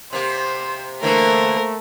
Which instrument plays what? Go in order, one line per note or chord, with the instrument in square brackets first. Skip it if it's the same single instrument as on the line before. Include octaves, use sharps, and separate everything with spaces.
[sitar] C3 A#3 [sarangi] C5
[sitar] D3 E3 E4 [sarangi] A3 [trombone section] A#3 C5 [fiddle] A#4